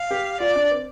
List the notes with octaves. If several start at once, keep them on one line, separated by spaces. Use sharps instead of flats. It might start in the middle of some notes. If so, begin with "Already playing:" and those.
Already playing: F5
G4
F4 D5
D4
C4